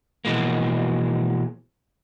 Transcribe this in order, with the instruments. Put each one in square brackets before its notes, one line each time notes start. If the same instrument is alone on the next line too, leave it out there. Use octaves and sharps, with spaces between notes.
[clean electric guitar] B2 E3 F3 G#3 A#3